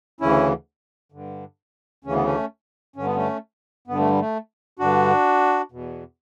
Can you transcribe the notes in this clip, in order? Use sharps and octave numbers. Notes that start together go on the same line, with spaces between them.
D2 C#3 E3 C#4 E4
G2 D3
D2 C#3 E3 C#4
B3
A3 C#4
G2 D3 C#4
B3
A3 C#4
G2 D3 B3
A3
G3
A3
G2 D3 D4 F#4
E2 B2